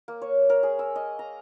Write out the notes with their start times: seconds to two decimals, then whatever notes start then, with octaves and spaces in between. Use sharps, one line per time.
0.08 A#3
0.22 C#5
0.50 A#4
0.63 G#4
0.79 E6
0.96 D#5
1.19 A#5